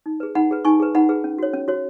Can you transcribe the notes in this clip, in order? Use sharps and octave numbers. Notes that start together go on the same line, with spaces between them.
D#4
G#4 B4
D#4 F#5 B5
G#4 B4
D#4 G#5 C#6
G#4 B4
D#4 F#5 B5
G#4 B4
C#4
F#4 C#5
C#4
F#4 C#5